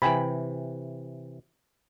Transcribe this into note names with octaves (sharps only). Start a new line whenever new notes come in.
C3 E3 G5 G#5 B5